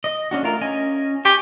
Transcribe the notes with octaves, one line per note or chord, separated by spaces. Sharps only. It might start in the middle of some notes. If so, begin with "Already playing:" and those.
D#5
C#4 D4 F#4
A3 F4 A#4
C#4 D#5 G#5
G4 G#5 C#6